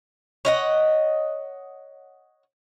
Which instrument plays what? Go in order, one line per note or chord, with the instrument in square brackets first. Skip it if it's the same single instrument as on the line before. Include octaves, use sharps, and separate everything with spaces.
[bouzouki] C#5 D#5 F#5